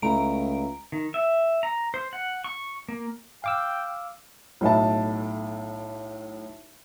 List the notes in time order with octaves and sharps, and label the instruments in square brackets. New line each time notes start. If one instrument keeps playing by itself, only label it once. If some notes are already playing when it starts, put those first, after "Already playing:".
[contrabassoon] C#2 [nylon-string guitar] A3 E4 [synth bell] A#5 D7
[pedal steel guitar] D#3
E5
A#5
C5
F#5
C#6
A#3
[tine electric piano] F5 D6 E6 [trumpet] G5
[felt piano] B1 A2 E5 A5